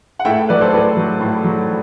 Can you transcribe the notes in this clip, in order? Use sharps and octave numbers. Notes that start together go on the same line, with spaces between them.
F#5
A2 E5 G5
F#3 B4 D5
A4 C5
A2 B4 D5
F#3
A2
F#3